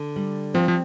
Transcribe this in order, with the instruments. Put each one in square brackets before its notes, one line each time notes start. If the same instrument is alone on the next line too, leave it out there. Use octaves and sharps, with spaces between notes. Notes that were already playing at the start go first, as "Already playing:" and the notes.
Already playing: [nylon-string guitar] D3
G3
[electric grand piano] F3 [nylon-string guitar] C4
[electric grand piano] F3